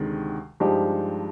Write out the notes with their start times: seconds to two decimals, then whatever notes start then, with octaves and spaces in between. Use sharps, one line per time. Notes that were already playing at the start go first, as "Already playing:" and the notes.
Already playing: D2 C3 D#3 G#3
0.60 G2 F3 G#3 D#4 G4